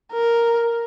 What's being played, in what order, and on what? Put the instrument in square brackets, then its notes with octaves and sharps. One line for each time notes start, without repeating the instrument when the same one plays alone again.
[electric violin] A#4